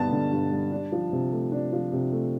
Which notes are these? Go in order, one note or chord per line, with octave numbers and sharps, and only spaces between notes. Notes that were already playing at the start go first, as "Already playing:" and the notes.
Already playing: G2 D3 G3 B3 A5
D3
G2
G3
D4
F3
C3
A3
D4
F3
C3
A3